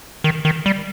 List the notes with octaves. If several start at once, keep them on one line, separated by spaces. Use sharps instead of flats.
D#3
D#3
G3